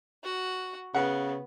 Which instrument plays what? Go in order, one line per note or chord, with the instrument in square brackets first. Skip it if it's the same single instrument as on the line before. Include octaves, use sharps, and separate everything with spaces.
[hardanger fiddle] F#4 F#5
[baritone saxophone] C#3 [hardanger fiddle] B3 [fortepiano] F#5